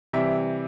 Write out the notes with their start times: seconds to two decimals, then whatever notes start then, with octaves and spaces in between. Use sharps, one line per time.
0.13 C3 E3 G3 C4 E5